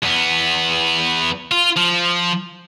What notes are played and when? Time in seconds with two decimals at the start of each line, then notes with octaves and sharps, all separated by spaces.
0.03 E2 B3
1.51 F4
1.76 F3